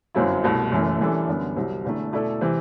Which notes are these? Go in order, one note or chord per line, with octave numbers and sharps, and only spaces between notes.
G1 F#2 F#3 C4 E4
C2 B2 A3
F#1 F#2 E3 A3
F#2 E3 G3 D4 A4
F#2 D3 G3 B3
C2 C3 F#3
E1 E2 D3 A3
B2 A3 E4 A4 D5
C3 E3